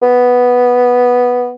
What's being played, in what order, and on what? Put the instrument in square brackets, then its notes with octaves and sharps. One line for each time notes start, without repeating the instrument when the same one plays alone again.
[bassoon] B3